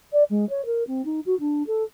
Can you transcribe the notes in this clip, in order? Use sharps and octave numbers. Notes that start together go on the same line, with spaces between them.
D5
G#3
C#5
A#4
C4
D#4
F#4
D4
A4